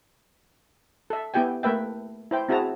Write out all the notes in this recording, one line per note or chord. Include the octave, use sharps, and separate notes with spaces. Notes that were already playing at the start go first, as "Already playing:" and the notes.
A4 E5
B3 E4 G4 G5 G#5
A3 A#3 B4 E5 G5
E4 C5 G5
C4 E4 F#4 G#4 A5 A#5